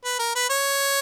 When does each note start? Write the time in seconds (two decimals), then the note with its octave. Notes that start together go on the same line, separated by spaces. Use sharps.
0.04 B4
0.19 A#4
0.35 B4
0.50 C#5